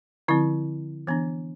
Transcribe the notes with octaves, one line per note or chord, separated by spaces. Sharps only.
D3 F3 C4 E4
E3 B3 D4